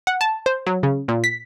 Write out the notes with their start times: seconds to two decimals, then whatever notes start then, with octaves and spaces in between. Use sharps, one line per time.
0.07 F#5
0.21 A5
0.46 C5
0.66 F#3
0.83 C#3
1.08 A#2
1.24 B6